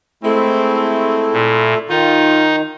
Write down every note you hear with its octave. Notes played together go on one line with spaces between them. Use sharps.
G#3 A3 C4 E4
A#2
D#3 D#4 F4